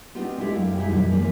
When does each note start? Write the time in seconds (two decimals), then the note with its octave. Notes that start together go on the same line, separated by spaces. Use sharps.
0.15 B3 C4 D4 D#4 F4 G4
0.38 G#3 D4 E4 F4 G4 A4
0.55 F#2 E4 F5 G5
0.77 G3 G#3 D#4 E4 G4 G#4
0.89 F#2 B2 D#3 F3 G3
1.11 D#2 A2 E3 F3 G#3 A#3